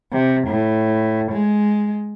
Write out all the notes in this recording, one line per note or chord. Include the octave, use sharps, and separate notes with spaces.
C3
A2
G#3